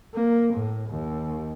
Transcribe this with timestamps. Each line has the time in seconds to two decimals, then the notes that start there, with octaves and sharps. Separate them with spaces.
0.15 A#3
0.54 A2
0.90 D#2